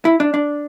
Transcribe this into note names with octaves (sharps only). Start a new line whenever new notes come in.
E4
D4
D4